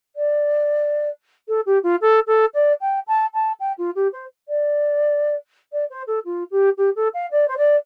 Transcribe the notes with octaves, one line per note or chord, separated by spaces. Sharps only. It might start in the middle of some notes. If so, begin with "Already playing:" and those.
D5
A4
G4
F4
A4
A4
D5
G5
A5
A5
G5
F4
G4
C5
D5
D5
C5
A4
F4
G4
G4
A4
F5
D5
C5
D5